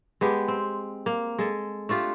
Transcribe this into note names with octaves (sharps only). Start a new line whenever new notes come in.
G#3 B3 G4
C4
A#3
G#3 A4
A3 D4 F4 G4